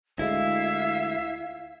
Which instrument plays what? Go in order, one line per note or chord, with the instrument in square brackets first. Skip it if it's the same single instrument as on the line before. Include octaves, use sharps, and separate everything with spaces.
[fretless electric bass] D2 G#3 [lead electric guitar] E4 [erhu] E5 [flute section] F5